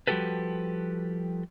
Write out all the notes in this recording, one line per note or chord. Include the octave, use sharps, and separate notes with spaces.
F3 G3 F#4 G4 A4 B4